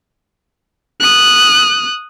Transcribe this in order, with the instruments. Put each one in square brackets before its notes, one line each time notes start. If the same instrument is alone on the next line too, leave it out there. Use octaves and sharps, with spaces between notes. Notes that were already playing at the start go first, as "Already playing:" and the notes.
[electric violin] D#6 F#6